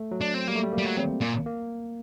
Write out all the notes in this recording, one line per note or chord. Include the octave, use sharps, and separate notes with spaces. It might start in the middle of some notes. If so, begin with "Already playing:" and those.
Already playing: A3
F#3
D4
C4
G3 A#3
A3
G3
A#3
G3
F#3
C4
A#2 A#3
A#3